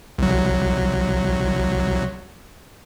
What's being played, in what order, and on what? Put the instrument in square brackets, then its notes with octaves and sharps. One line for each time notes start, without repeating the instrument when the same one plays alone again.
[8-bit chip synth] C2 F#3